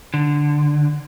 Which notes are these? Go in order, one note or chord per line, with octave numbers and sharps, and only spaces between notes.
D3